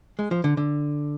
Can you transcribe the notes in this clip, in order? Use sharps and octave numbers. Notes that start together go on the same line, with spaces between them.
G#3
F3
D3
D3